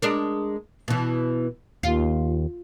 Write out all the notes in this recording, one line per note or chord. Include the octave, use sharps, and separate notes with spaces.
G#3 D4 A#4
B2 E3
D#2 F4